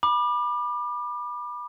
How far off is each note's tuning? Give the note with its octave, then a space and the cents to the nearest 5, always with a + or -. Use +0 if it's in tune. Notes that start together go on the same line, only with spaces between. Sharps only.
B5 -15 D6 +30